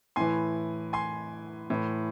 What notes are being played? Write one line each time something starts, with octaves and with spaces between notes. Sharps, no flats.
A2 E3 G#5 C6
G#5 C6
A2 E3